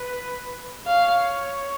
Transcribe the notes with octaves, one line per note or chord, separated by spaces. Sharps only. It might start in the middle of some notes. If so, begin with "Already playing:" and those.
Already playing: B4
C#5 F5